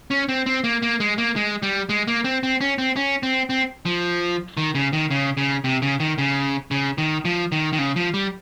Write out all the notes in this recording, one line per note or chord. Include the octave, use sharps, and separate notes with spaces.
C#4
C4
C4
A#3
A#3
G#3
A#3
G#3
G3
G#3
A#3
C4
C4
C#4
C4
C#4
C4
C4
F3
D#3
C#3
D#3
C#3
C#3
C3
C#3
D#3
C#3
C#3
D#3
F3
D#3
D#3
C#3
F3
G3